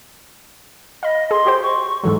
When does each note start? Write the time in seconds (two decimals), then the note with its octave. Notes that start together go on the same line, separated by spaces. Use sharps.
1.03 D#5 F5 B5
1.31 G#4 C6
1.45 F#4 G4 C5
1.63 C#6
2.03 G#2 E3 F#3 A4